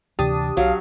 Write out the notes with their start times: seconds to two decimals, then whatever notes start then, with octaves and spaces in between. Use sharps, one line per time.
0.19 D2 C3 E3 D4 G4 A5 D#6
0.57 B1 F#3 F5